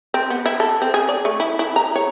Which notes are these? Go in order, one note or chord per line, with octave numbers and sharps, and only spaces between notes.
C4
B3
E4
A4
C4
G#4
D5
A3
E4
E4
A#5
C#5